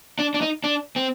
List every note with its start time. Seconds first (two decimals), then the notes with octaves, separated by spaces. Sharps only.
0.19 D4
0.34 D4
0.41 D#4
0.64 D4
0.96 C4